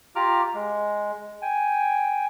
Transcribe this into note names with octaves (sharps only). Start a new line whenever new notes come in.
F4 G4 A#5 D6 F6
G#3
G5 G#5